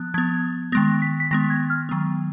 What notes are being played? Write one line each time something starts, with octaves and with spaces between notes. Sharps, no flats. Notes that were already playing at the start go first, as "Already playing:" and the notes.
Already playing: F3 B3 F#6
F3 B3 G#6
D#3 G#3 B3 A#6
B6
B6
D#3 G#3 B3 A#6
G#6
F6
D#3 F#3 B3